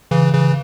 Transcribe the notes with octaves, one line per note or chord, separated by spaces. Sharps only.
C#3 E3
C#3 E3